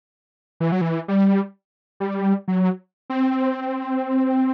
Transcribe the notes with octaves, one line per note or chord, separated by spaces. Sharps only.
E3
F#3
E3
G3
G3
F#3
C4